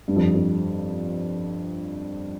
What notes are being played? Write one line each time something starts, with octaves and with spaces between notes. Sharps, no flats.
G2
F2
F2